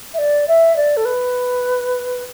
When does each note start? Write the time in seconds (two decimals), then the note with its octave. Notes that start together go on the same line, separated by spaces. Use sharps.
0.14 E5
0.18 D5
0.48 E5
0.76 D5
0.97 A4
1.05 B4